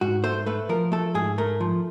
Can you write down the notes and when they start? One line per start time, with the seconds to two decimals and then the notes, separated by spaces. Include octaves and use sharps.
0.01 G#2 F#4
0.24 A3 C5
0.46 A3 B4
0.69 F3 A#4
0.92 A3 A4
1.14 G#2 G#4
1.38 A3 A#4
1.60 F3